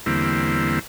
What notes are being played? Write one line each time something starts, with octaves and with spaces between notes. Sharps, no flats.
E2 D3 G3 A#3 C4 E4